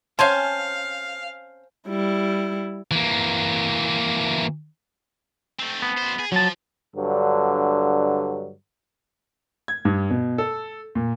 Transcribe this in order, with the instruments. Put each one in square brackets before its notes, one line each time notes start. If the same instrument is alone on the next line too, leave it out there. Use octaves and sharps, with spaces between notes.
[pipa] C4 C#4 [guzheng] C5 G#5 A5 [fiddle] F5
[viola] G3 E4
[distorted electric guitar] E3 A#3
A3 C4
[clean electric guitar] B3
[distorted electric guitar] F#2 C5
G#4
[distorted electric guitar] F3 [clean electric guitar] F#3 A5
[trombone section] G2 D3 F#3
[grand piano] G#6
G2
B2
A4
A#2